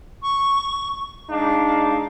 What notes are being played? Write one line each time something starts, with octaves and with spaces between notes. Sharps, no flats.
C#6
G#3 D4 D#4 F5